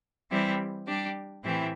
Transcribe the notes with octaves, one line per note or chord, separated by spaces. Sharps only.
E3 G3 C4 E4 G4
G3 D4 G4
A2 E3 C4 E4 G4